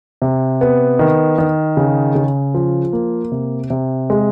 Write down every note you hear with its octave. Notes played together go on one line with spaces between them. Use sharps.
C3
B3
D#3
D#3
C#3
C#3
F3
A#3
C3
C3
G#3